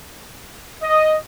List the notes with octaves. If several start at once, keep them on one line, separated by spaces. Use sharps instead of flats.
D#5